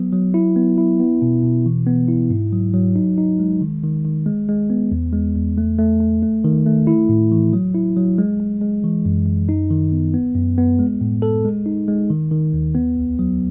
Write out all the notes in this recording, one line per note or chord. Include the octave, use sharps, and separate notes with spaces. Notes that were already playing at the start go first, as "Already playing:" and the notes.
Already playing: F#3 B3
F#3
E4
B3
E4
B3
B2
B2
E3
B3
E4
G#2
F#3
F#3
D#4
D#4
G#3
D#3
D#3
D#3
G#3
G#3
B3
E2
G#3
E2
A3
A3
A3
A3
D#3
A3
E4
A2
E3
F#3
E4
F#3
G#3
G#3
G#3
E3
F#2
F#2
D#4
D#3
B3
B3
F#2
B3
G#3
A2
A4
G#3
D#4
G#3
D#3
D#3
D#2
B3
C#2
F#3